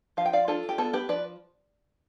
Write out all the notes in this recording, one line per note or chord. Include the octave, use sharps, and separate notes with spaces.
F3 F5
G5
D5 F5
D4 F4 A4
G4
B3 F4 A4
G4 B4
F3 B4 D5